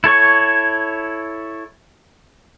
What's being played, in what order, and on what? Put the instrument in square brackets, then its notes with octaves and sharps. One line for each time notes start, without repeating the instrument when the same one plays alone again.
[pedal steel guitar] E4 A4 C#5 C#6